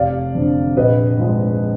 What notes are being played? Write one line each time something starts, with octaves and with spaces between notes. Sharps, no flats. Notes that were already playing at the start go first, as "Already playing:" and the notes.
Already playing: F1 D5 F5
F2 D3
A#1 B4 D#5
G#2 F3 G#3